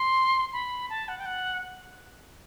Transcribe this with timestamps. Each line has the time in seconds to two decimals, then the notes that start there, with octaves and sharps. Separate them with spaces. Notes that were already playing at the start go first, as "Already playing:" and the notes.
Already playing: C6
0.53 B5
0.90 A5
1.08 F#5
1.19 G5
1.26 F#5